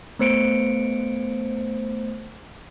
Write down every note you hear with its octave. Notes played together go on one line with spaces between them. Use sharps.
A3 B3 C5 C#7 D7